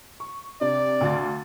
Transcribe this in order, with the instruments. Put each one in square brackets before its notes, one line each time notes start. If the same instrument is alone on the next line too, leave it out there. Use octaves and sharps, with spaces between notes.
[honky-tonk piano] C#6
[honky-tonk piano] C3 D4 [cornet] D5
[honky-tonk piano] D2 F5 A6